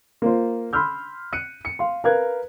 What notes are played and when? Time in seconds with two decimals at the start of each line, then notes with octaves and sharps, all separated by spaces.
0.22 A#3 F4 C5
0.73 B5 C6 E6 F6 G6
1.32 F#6 C#7 D#7
1.65 C#7
1.79 F5 C6
2.04 A#4 B4 F5 F#6 G#6